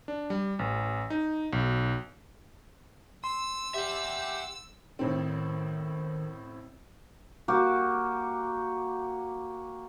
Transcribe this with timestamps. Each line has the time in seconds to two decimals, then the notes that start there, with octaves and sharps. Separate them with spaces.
0.08 D4
0.30 G3
0.59 A1
1.10 D#4
1.53 B1
3.24 C6 E6
3.74 G4 E5 F#5
4.99 A1 A2 D#3 C4
7.48 A#3 F#4 G4